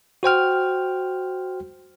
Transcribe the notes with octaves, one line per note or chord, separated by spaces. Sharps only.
F#4 C5 G5 F6